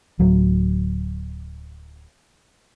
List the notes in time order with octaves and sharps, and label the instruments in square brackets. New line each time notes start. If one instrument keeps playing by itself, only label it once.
[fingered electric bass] D1 F#3